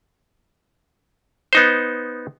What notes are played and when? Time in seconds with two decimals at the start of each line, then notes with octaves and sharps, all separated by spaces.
1.53 B3 D#4 C5